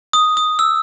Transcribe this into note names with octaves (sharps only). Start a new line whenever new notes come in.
D#6
D#6
E6